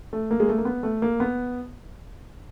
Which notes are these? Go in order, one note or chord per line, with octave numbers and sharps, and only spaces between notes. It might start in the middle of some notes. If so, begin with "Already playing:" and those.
A3
A#3
G#3
A3
A#3
B3
A3
A#3
B3